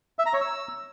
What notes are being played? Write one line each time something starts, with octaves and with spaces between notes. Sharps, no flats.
E5
A#5
C#5
E6